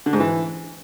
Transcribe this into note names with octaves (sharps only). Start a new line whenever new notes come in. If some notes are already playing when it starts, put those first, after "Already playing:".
D3
G#2
E3